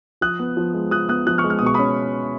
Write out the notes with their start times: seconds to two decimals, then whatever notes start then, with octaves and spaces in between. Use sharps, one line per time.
0.21 F3 D#6 F#6
0.39 B3
0.57 F3
0.74 G#3
0.91 F3 D#6 F#6
1.09 B3 D#6 F#6
1.27 F3 D#6 F#6
1.38 C#6 F6
1.44 G#3
1.50 F6
1.59 D#6
1.62 B2 C#6
1.74 C#4 B5 D#6